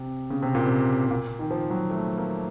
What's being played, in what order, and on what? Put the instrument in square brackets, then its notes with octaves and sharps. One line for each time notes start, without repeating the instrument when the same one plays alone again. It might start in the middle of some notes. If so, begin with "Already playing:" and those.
Already playing: [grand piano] C3
C#3
C3
A#2
C3
C3
A#2
D#3
F3
F#3
A3
A#3